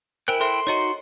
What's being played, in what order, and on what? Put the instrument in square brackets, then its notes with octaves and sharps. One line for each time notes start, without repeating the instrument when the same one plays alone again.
[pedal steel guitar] E4 G5 F#6 [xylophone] A#4 C5 G#5
[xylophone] A4 C5 E5 [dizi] C6
[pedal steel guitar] D#4 F#4 [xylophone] C#5 D#5 A#5